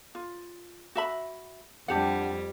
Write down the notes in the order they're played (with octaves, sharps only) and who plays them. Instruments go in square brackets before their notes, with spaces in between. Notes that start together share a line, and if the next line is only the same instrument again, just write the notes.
[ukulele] F4
F#4 E5 B5
[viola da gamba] F2 G3 [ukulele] D4 G4 F#5